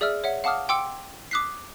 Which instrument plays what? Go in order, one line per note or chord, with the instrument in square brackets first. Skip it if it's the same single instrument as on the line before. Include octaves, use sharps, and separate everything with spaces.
[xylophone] G#4 D5 E5 E6 F6
C#5 E5 F#5
F5 F#5 A5 D6 D#6 F6
G5 C6 D6 E6 C#7 D7
D6 D#6 F#6 B6 C7